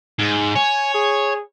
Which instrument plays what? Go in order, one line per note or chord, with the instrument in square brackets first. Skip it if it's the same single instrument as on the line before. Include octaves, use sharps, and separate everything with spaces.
[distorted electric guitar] G#2
[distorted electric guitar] C#5 [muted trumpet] G#5
[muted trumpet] G#4